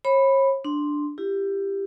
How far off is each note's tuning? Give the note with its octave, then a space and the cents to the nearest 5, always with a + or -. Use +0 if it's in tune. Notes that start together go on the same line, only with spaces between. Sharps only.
C#5 -40 B5 +0
D4 +5 C6 +0
E4 +35 G4 +10